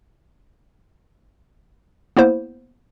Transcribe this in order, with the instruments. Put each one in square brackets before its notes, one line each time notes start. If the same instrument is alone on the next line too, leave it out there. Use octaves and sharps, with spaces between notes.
[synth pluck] A#3 B3 E4 C5